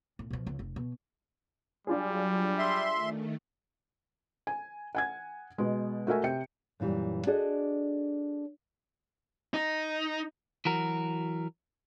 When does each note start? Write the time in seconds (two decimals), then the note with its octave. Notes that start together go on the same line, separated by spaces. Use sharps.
0.19 A2
0.31 B2 F3
0.47 C#2
0.59 F1
0.76 B2
1.87 F#3 G3 D4 F4 G#4
2.58 E5 C6
2.92 D#3 A3
4.47 G#5
4.95 F#5 G#5 G#6
5.58 B2 G#3
6.07 A3 F#4 A#4 E5 G#5
6.24 C3 G5 C#7
6.80 F#2 A#2 E3 G3
7.27 D4 F#4 G#4 A4 D5 D#5
9.54 D#4
10.65 E3 F#3 F#4 A#4